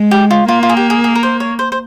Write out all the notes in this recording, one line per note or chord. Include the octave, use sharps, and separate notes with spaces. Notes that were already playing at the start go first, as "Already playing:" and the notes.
Already playing: G#3
G4
F4
A#3 F4
F4
G#4
G4
G#4
G#4
A#4
C5
C#5
C5
C5